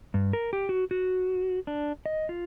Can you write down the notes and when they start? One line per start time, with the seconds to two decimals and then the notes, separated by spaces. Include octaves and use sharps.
0.14 G2
0.33 A#4
0.53 G4
0.69 F#4
0.91 F#4
1.67 D4
2.06 D#5
2.29 F4